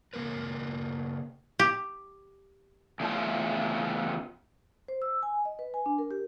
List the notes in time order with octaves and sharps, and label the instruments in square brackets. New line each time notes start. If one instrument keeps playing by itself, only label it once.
[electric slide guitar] C#3 F#3 A#3 A#4 B4
[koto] G4
[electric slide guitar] E2 C#3 A3 D4 F4 A5
[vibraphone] C5
E6
G#5
D#5
B4
G#5
D4
A#4
G4